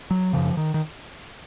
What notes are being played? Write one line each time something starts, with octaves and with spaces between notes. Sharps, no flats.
F#3
F#2 C#3 F3
D#3
D#3